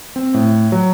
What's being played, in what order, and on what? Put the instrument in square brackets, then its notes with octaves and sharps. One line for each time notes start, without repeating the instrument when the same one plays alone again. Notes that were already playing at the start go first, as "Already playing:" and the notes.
[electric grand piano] C4
A2
F#3